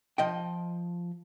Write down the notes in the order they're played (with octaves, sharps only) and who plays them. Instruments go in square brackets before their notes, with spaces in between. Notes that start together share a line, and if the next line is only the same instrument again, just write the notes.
[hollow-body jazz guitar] F3 D#5 G5